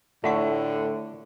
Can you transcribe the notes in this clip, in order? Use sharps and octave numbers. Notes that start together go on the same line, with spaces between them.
A2 D3 A3 F4 F#5 C#6